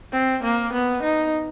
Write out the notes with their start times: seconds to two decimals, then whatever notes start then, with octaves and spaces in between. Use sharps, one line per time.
0.13 C4
0.43 A#3
0.73 B3
1.03 D#4